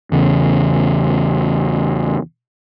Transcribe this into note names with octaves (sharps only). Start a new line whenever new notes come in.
E2 C#3